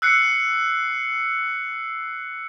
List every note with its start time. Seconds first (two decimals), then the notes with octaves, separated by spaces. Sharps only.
0.02 E6 F#6 C7 C#7